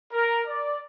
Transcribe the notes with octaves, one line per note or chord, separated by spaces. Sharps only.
A#4
D5